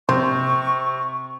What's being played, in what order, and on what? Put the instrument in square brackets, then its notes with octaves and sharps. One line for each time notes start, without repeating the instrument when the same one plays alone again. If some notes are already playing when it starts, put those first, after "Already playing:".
[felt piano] C3 [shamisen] C5 [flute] C#6